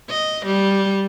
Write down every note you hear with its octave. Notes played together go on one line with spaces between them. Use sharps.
D#5
G3